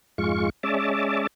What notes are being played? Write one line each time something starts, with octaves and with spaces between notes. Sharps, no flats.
F2 G#2 G#3 F4 C#6
G#3 C#4 D5 E5 A5